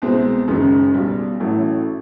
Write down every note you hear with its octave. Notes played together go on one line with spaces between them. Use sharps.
C2 B2 G#3 C4
F#1 F#2 D#3 G#3
B1 B2 G3
A1 A2 F#3 A3